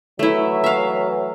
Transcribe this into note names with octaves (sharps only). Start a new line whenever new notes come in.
E3 F#3 A3 E4
E5 F5